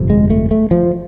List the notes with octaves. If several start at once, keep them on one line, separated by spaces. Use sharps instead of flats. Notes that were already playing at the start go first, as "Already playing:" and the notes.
Already playing: G1 F2 C3
G#3
A3
A3
F3